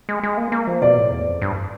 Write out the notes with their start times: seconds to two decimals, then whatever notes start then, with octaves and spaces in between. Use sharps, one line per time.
0.09 G#3
0.23 G#3
0.37 A#3
0.52 A#3
0.67 F3
0.82 B2 D5
0.97 A2
1.11 E2
1.27 F2
1.42 G2